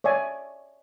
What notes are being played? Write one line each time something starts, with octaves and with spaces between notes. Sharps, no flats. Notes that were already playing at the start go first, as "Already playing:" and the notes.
C#5 D5 E5 G#5